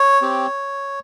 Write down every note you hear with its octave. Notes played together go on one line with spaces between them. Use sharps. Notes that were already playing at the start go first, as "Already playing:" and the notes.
Already playing: C#5
C4 G4